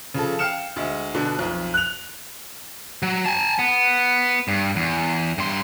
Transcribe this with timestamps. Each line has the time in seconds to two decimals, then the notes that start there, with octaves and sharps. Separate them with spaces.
0.14 C#3 F3 A4
0.39 F5 G5 F6 C#7 E7
0.76 D2 G#3
1.15 B2 D3 D4
1.39 B1 F2
1.74 F#6 F7
3.03 F#3
3.26 G#5 A5
3.59 B3
4.48 G2
4.76 E2
5.38 G2 C6